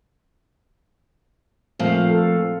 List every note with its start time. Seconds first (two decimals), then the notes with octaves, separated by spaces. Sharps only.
1.80 A#2 F3 A3 C4 F5
2.10 A4